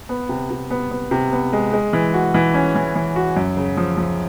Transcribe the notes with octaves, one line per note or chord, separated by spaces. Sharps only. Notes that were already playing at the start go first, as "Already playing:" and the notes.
B3
C3
C3
B3
B3
C3
B3
G#3
G#3
E3
F#4
E3
C#4
E3
E3
F#4
F#2
C#3
F3
F3